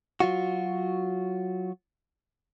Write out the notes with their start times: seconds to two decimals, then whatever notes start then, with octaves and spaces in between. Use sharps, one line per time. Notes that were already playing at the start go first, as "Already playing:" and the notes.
0.20 F#3 F4 F#4